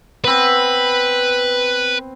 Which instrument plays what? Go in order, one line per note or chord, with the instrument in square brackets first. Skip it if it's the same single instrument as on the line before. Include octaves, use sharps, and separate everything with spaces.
[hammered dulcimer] B3 C4 [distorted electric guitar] B4